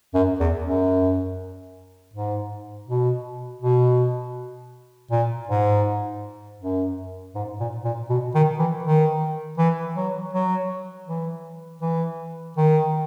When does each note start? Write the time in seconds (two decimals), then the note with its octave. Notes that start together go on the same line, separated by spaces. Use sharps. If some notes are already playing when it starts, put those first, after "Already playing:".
0.15 F#2
0.40 E2
0.64 F#2
2.14 G#2
2.87 B2
3.62 B2
5.11 A#2
5.49 G#2
6.60 F#2
7.35 G#2
7.60 A#2
7.85 A#2
8.10 B2
8.35 D#3
8.59 E3
8.84 D#3
9.58 E3
9.96 F#3
10.33 F#3
11.07 E3
11.81 E3
12.57 D#3